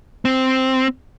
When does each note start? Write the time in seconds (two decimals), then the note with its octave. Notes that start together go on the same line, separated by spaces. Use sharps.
0.25 C4